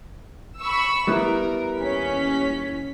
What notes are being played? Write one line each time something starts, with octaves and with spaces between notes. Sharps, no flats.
B5 C#6 E6
G3 B3 E4 A#4
D#2 C#4 B6